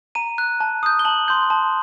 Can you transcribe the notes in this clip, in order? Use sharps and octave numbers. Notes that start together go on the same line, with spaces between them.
A#5 D#7
F#6
A5
D#6 G6
G7
A5 F#7
C6 G6
A5